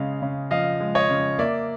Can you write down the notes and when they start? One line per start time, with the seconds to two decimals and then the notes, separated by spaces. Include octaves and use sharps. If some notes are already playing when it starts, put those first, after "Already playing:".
Already playing: C#3 G#3 D#5 F5
0.22 C#3
0.51 F3 D#5 F5
0.80 G#3
0.95 C#5 D#5
1.10 C#3
1.39 A#3 D5 E5